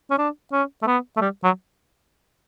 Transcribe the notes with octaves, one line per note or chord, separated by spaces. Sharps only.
C#4
D4
C#4
A3
B3
A3
G3
F#3